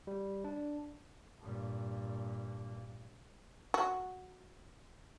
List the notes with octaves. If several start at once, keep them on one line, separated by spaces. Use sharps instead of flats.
G3
D4
G2 A#2
F#4